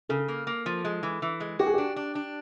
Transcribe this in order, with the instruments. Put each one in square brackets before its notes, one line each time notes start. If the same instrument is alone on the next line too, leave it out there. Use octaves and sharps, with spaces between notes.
[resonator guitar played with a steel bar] C#3 [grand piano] A4
[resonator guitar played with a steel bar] A#3
A#3
F3
G#3
E3
E3
G#3
[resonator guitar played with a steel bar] F#4 [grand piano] G4
[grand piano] G#4
[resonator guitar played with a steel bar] D4 [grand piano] G4
[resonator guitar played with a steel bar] D4
D4